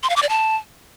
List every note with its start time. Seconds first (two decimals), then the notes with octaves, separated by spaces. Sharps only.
0.03 C6
0.10 F5
0.16 D6
0.23 D5
0.29 A5